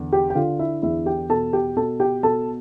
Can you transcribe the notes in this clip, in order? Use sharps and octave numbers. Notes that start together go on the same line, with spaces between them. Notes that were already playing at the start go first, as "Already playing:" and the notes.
Already playing: E2 D3
G4 G5
G5
D3 F4 F5
E4 E5
E2 E4 E5
G4 G5
B2 A4 A5
G4 G5
B2 A4 A5
G4 G5
B2 A4 A5